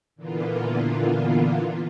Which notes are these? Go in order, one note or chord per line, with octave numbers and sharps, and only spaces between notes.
A#2 D3 E3 A#3 B3 F4